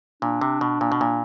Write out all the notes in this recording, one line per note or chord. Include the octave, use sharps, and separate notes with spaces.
A#2 D4
C3
B2
A#2
B2
A#2